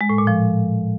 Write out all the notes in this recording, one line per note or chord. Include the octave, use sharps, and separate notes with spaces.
G#3
A2
A#2
F3